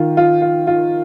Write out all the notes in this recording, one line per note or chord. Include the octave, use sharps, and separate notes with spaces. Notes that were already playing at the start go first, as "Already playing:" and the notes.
Already playing: D#3 F4
F4
F4
F4